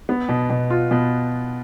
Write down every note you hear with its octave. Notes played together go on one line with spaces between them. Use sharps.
B3
B2
B2
F4
B2